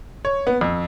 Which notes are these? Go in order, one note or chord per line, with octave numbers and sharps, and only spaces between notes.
C#5
B3
F2